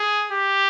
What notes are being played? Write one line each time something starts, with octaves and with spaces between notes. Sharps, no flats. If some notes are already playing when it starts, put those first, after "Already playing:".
Already playing: G#4
G4